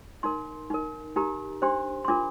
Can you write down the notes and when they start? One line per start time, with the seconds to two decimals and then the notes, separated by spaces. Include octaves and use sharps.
0.23 D#4 A#4 C6
0.70 D#4 A#4
1.16 D#4 G4 A#4 A#5
1.62 D4 G4 C5 C6
2.05 C6
2.08 D4 F4 A#4 D6